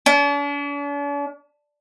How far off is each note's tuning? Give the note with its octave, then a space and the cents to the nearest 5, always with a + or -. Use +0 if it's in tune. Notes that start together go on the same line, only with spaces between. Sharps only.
D4 -45